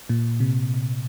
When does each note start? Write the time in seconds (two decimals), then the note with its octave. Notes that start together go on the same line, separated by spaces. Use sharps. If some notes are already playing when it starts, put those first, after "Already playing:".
0.09 A#2
0.40 C3